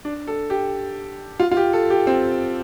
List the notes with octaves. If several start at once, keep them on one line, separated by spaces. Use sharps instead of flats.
D4
A4
G4
F4
F4
G4
A4
G4
C4